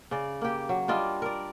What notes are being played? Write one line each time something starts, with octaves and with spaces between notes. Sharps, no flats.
C#3 D5
A#3 G4
F#3
G3 D4 F4 D#5
A#4 D5